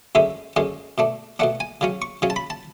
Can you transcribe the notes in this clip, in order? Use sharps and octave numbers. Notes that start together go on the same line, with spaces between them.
F#2 D3 G#3 C#4 E5
F#2 D3 G#3 C#4
B2 A3 D4
B2 A3 D4 F#5
G#5
C#3 F#3 C#4
C#6
C#3 F#3 C#4
A5
B5
A5